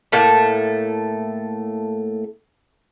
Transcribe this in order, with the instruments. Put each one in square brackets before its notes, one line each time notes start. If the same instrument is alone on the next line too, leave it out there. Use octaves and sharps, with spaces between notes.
[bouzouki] A2 A3 A#3 A5